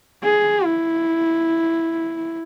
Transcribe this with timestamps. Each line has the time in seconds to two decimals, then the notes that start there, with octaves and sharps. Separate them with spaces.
0.24 G#4
0.65 E4